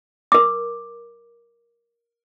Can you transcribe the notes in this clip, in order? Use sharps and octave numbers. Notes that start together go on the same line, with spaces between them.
A#4 D6